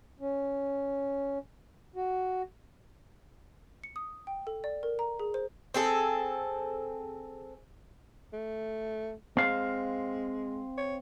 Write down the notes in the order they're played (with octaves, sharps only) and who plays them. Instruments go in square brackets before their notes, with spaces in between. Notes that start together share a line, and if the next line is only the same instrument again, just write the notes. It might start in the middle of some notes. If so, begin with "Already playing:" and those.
[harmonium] C#4
F#4
[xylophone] C#7
D#6
G5
A4
D5
A#4
A#5
G#4
C5
[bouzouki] C4 G#4 A4
[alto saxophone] A3
[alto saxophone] G#3 [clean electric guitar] C4 F5
[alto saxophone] C#5